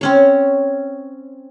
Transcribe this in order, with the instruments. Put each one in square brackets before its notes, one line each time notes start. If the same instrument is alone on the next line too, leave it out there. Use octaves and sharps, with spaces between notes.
[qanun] C4 C#4 C#5